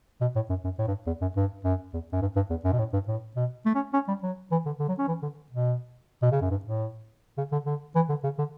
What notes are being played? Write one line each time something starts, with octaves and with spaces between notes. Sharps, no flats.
B2
A2
F#2
F#2
A2
G2
E2
F#2
G2
F#2
E2
F#2
G2
G2
E2
F#2
B2
A2
G2
A2
B2
A3
C#4
C#4
G3
F#3
E3
D3
D3
F#3
C#4
E3
D3
B2
B2
C#3
F#2
G2
A2
C#3
D3
D3
E3
D3
C#3
D3